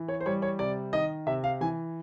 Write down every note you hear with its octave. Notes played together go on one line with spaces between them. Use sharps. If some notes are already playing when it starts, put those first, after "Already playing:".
Already playing: E3
C#5
C5
G3 C#5
C#5
C3 D5
D#3 D#5
C3 E5
F5
E3 G#5